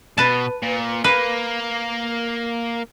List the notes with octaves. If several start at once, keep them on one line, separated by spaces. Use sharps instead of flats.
B2 B4 A5
A#2
A#3 B4